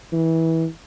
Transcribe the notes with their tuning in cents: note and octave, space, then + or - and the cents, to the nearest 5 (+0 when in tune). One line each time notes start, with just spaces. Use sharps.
E3 -20